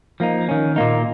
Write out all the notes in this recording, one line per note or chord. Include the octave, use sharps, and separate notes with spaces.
F3 A#3 D#4
D#3 C#4
A#2 A#3 D#4